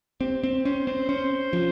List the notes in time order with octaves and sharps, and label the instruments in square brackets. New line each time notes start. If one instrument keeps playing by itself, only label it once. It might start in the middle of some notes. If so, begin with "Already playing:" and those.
[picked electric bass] C4 [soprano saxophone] G4
[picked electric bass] C4
[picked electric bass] C#4 [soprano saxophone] C5
[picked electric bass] C4 [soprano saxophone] C5
[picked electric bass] C#4 [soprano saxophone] C5
[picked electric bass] F3